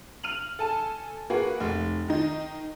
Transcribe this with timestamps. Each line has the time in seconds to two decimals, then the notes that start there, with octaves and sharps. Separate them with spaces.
0.23 F6 D#7 F7 F#7
0.59 A4 G#5 A5
1.30 A#3 F#4 G#4 B4
1.60 F1
2.08 D#3 D#4